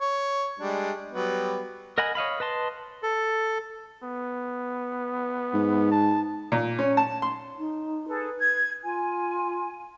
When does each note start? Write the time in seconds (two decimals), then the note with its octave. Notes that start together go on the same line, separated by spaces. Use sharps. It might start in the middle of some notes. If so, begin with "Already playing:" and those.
0.01 C#5
0.60 G3 G#3 D4
1.12 F#3 G3 B3
1.98 A#4 D#5 F#5 G#5 B5
2.15 C#5 D#5 F5 B5
2.40 B4 D#5 A5 C6
3.03 A4
4.03 B3
5.54 G#2
5.92 A5
6.52 A#2
6.79 C#4
6.97 A5
7.22 C6
7.58 D#4
8.08 G#4 A4 B4
8.41 G#6
8.84 F4 G#5